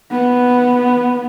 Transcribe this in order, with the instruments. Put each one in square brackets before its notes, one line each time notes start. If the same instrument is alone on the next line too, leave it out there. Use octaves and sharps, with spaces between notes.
[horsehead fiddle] B3